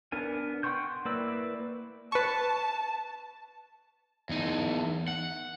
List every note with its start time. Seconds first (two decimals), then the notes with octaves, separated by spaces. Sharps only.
0.12 B3 D4 A#4 G#5
0.63 F#5 G5 C6 C#6 G6
1.05 A#3 E4 B4 D5 E6
2.12 B4 A5 C#6
4.29 E2 D#4
5.08 F#5